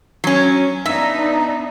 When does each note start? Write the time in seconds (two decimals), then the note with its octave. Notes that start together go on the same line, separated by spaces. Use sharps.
0.24 F#3 C#4
0.86 B3 D4 D#4 E5